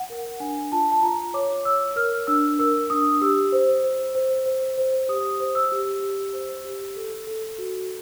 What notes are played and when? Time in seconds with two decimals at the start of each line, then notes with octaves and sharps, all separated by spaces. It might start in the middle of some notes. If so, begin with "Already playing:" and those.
Already playing: F#5
0.10 A#4
0.40 D4 G#5
0.72 F4 A5
0.92 A5
1.02 F4 A#5
1.34 C#5 D6
1.65 C#5 E6
1.96 A#4 F6
2.27 D4 E6
2.59 A#4 E6
2.90 D4 D#6
3.21 G4 E6
3.52 C5
3.84 C5
4.15 C5
4.46 C5
4.77 C5
5.09 G4 D#6
5.40 C5
5.55 E6
5.72 G4
6.03 G4
6.33 C5
6.65 G4
6.96 A4
7.27 A4
7.58 F#4